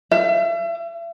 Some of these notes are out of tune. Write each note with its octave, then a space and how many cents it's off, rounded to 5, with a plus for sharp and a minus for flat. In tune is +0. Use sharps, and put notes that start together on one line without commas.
E5 +40